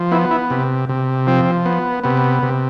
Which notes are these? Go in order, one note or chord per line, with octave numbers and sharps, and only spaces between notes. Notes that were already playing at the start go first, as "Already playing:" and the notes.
Already playing: F3
B3 E4
E4
C3
C3
F3 C4
B3
C3 B3
C3